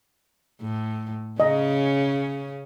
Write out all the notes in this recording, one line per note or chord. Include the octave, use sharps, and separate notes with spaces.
A2
C#3 C#4 D#5